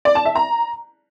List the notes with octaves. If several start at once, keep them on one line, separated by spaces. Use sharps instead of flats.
D5
A5
E5
A#5